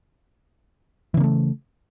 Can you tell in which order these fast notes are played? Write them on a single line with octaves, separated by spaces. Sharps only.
E3 C#3 A#3 A3